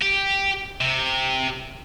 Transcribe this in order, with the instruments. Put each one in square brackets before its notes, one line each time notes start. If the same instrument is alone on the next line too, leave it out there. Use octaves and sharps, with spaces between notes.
[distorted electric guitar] G4
C3